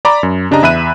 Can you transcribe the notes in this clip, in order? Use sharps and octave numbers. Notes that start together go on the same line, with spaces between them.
D5 A#5 B5 D6
F#2
C#3 D4 G4 D#5 A#5
E2 E5 B5 F#6 D#7